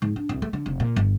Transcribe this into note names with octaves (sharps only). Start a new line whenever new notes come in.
G#2
D4
C2
A3
D3
F1
A#2
G1